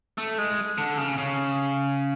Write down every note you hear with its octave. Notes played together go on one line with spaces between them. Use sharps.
A3
G#3
D3
C#3
C#3